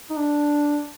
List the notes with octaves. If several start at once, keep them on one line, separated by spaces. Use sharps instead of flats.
D#4
D4